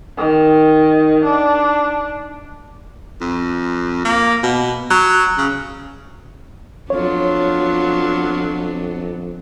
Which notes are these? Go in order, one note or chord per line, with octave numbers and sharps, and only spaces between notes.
D#3
D4
F2
A#3
B2
F#3
C#3
F2 F#3 B3 D4 F4 C#5